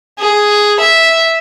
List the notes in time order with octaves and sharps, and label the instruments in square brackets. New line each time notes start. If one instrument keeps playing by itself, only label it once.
[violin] G#4
E5